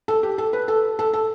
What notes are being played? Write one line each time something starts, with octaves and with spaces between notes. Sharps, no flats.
A4
G4
A4
B4
A4
A4
A4